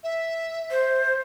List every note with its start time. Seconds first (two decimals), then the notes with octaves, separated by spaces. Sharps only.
0.04 E5
0.71 C5